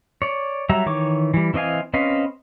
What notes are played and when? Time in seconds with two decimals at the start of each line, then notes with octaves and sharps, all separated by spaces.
0.22 C#5 D5
0.69 F#3 G3 E5 A#5
0.86 D#3 E3 C#5 C#6 D6
1.34 E3 G3
1.54 E3 C4 D#5 F5 G#5
1.94 C4 C#4 B4 D#5 F5